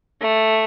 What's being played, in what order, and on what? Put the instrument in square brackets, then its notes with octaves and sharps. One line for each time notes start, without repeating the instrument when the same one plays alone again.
[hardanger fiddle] A3